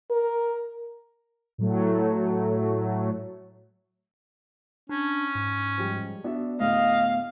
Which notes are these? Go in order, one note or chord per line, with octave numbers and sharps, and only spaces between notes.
A#4
A2 F#3 A3
C#4 D4
G#2
F3 G3 G#3
B3 D4 F#4 E5
D2 A2 G#4 D#5 F5